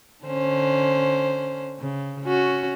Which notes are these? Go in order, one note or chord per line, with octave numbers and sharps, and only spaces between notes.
D3 C#4 C5
C#3
C#4 F#4